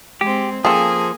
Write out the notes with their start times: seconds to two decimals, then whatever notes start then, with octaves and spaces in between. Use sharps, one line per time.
0.21 G#3 C4 G4
0.65 C#3 F3 A#3 C4 G#4 A4 G#5